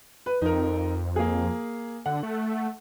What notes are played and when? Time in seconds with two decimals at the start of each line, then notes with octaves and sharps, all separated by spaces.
0.26 B4
0.42 F2 D#4 A#4
1.16 A#3 G#4
2.06 D3 F#5
2.23 A3